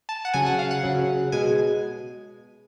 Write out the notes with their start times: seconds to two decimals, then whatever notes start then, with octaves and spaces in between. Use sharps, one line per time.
0.09 A5
0.25 F#5
0.34 C#3 F#3 G#5
0.46 F#5
0.59 F5
0.71 F#5
0.83 C#3 F#3
1.32 B2 G#3 G#5